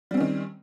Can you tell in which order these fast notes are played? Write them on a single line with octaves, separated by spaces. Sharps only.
G3 C4 C#4 D#3